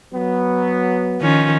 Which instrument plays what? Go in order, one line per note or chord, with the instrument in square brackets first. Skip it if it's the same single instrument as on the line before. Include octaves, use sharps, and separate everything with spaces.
[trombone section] F#3 B3
[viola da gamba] D#3 F3 C#4